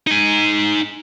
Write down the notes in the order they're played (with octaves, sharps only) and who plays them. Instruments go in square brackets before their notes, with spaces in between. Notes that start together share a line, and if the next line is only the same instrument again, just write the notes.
[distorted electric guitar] D#4 G#5